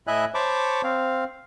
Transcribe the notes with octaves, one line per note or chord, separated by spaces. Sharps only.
A2 E4 D#5 E5 G#5 F#6
C5 C#5 A5 B5 C#6 D6
C4 F5